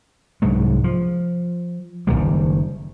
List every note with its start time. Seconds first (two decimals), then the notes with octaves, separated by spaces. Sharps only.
0.42 C2 G#2 F#3 G#3
0.84 F3
2.07 F#1 E2 D#3 G3